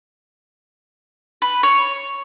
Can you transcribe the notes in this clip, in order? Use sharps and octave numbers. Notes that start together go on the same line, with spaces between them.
B4
C#5